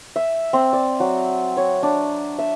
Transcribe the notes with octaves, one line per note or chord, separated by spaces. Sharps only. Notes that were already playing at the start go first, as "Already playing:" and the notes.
E5
C4
D5
F#3
C#5
D4
E5